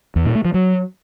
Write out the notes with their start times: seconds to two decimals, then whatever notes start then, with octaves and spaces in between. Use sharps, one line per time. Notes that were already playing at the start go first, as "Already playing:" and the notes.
0.16 E2
0.25 A#2
0.35 A3
0.45 F3
0.54 F#3